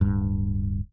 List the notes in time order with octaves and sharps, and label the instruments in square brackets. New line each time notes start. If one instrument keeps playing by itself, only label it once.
[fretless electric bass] D1 G2